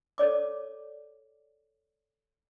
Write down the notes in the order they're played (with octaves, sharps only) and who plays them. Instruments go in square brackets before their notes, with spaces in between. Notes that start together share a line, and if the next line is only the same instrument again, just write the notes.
[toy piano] A4 C#5 D5 D6